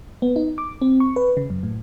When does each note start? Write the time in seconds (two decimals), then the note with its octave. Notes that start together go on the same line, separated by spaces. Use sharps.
0.22 B3
0.36 D#4
0.58 D6
0.82 C4
1.00 C#6
1.16 B4
1.37 C#3
1.50 F#2
1.63 A2